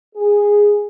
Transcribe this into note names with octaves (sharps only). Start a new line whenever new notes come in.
G#4